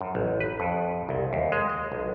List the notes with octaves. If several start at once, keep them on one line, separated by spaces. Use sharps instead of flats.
F#2
A1
B4
F2
C2
D#2
G#3
D#5
B1